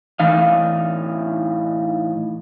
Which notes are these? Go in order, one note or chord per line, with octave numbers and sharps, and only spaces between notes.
A2 E3 D#4 F5